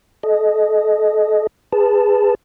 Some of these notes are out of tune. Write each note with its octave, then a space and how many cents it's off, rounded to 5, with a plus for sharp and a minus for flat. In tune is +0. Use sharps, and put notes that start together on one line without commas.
A4 -35 D#5 +0
G#4 -20 B4 +0 A5 +0